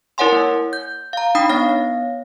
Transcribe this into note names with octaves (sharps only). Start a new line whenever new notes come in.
E4 A#4 C#5 F#5 G#5 C6
A#3
G6
F5 A#5
D4 D#4 G5 B5 D#6
B3 C#5 F5 A#6